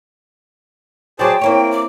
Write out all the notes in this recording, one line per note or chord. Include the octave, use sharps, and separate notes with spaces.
F#3 G#4 C5 D5 G5 A5
A#3 C4 E4 C#5
D6